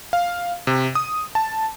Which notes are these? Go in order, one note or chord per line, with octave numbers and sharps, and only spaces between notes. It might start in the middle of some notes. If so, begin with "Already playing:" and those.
F5
C3
D#6
A5